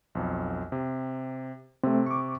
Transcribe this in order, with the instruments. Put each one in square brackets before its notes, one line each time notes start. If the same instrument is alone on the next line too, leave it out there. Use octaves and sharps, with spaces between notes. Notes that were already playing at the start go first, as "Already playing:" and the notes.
[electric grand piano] B1 F2
C3
[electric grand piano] C3 [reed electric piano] A3 C4
[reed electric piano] C#6 D6